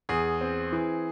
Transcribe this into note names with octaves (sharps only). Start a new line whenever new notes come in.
E2 G#4
C4
E3